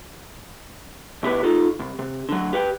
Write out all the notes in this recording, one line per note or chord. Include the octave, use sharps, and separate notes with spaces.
B2 E4 G4 B4
D#4 F4 A4
C2
C3
D3 F#3
G4 B4 F#5 G5